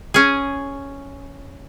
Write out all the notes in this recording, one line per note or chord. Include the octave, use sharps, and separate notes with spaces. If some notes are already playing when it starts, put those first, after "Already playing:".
C#4 G#4